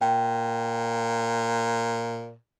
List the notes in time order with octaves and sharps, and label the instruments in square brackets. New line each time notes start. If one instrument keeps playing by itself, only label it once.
[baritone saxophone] A#2 [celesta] G5